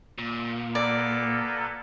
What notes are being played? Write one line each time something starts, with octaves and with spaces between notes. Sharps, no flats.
A#2
A#3 B3 A4 D5